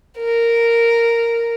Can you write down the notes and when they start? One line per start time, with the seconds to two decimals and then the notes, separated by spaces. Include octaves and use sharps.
0.18 A#4